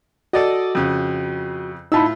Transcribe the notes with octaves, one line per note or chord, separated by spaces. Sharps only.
F#4 A4 D5 D#5
F2 C#3
A2 D#4 F4 A5 B5 E6